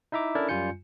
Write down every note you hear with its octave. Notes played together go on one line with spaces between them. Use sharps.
D#4 E4 E5 A#5 D6
C#4 D4 E4 A4 A#4 D5
F#2 G3 F4 G#5 G6 C#7